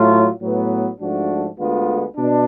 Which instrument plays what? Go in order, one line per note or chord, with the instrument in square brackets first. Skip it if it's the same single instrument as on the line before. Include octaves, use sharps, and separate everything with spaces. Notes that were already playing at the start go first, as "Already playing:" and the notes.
Already playing: [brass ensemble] A2 F#3 A3 F4
A2 F#3 B3
G#2 F3 A3 D4 F#4
D2 D3 G#3 B3 F4
B2 D4